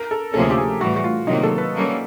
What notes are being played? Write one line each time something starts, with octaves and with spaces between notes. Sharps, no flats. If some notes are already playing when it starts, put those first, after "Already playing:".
Already playing: A#4
A4
D2 C3 F3 A#3 C#4 A4
G#4
G4
G#4
A2 E3 G3 F#4
F#4
F4
C3 D#3 F#3 A#3 D#4
A4
B4
G3 A#3 C#4